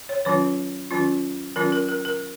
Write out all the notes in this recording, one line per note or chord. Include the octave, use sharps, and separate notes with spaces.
C#5
D#3 F#3 C#4 F4 C#5
D#3 F#3 C#4 F4
D#3 F#3 C#4 F4 A#4
A#4
A#4
A#4